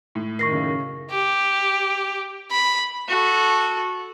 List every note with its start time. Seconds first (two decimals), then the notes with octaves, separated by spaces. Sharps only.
0.15 A2
0.39 F#2 D#3 A#4 C#6 A#6 C7
0.53 C#3
1.11 G4
2.51 B5
3.08 F#4 A4